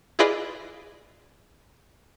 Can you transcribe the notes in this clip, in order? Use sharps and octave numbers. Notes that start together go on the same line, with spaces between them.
E4 F4 G#4 B4 D5 D#5